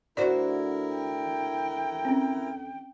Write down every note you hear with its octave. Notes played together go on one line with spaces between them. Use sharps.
D2 E4 F#4 A#4 C5 D5
G5
C4 C#4